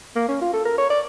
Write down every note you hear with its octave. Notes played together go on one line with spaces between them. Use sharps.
A#3
C#4
F4
A4
A#4
C#5
D5